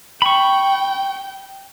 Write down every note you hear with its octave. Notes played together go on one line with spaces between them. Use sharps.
G5 B5 C#6